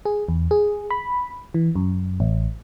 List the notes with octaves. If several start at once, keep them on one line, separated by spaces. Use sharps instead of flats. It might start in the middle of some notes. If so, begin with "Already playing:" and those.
G#4
E2
G#4
B5
E3
F#2
A1